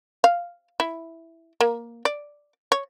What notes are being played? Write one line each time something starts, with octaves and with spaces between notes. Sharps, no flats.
F5
E4
A#3
D5
C#5